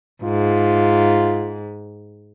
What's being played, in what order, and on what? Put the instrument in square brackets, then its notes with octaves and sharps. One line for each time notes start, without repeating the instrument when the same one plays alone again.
[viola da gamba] G#2 [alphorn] F4